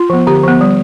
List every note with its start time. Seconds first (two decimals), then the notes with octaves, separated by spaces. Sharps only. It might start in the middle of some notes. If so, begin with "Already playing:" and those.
Already playing: F4
0.10 F3 B3
0.27 D3 G4
0.43 F3 B3
0.61 G3